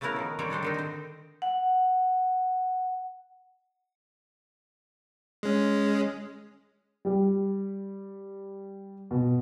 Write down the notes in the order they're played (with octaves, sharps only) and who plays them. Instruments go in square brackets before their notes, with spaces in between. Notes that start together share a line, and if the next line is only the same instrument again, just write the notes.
[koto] C#3 A3 B3 E4 A#4
D#3 F3
D#3 G3 C4 G4 C#5
D4 G4 A4 C5
D3 D#3 D#4
C4 C5
[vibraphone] F#5
[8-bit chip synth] G#3 C#4
[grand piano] G3 G4
B2